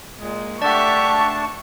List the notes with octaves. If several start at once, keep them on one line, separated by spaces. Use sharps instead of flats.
A#2 G#3
A3 D4 G4 D5 E5 F#5 A5 C#6